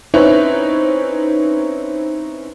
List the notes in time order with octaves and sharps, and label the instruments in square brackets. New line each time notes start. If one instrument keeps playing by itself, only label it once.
[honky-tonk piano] C4 C#4 D#4 E4 B4 C#5